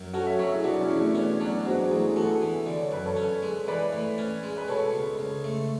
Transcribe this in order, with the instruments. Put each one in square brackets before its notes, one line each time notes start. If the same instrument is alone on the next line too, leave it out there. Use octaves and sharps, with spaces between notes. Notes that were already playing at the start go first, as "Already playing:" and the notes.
Already playing: [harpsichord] F#2
[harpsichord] C#4 [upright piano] F#4 A4
[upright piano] C#5 E5
[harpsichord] F#3 [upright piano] C#5 E5
[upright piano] E4 G#4
[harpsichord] B2 [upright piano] D4 F#4
[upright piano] C#4 E4
[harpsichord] E2
[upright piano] A3 C#4
[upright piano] B3 D4 [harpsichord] C#4
[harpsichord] F#3 [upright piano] B3 D4
[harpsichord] G#2 [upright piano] D4 F#4
[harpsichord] A1 [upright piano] E4 G#4
[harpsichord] B3 [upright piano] F#4 A4
[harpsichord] E3
[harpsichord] D3 [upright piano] D5
[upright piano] C#5
[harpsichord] F#2 [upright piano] B4
[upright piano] A4 C#5
[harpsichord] C#4
G#3
[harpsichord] E3 [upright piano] B4 D5
[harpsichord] A2
C#4
G#3
[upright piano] B4
[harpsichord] B2 [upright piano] A4 C#5
[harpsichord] C#2
C#2
A3